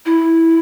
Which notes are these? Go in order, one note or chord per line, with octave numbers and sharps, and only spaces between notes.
E4